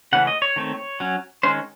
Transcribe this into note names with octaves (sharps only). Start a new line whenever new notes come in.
C#3 E3 A3 C#4 F#5
D#5
C#5
D#3 A3 C4
F#3 C#4
D#3 G#3 C#4 C5